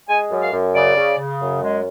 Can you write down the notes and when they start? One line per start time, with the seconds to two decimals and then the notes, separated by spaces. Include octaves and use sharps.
0.08 G#3 G#5
0.30 F#2
0.41 F5
0.52 F#2
0.74 C#3 D5
0.96 C#3
1.17 C#3
1.40 F#2
1.62 G#3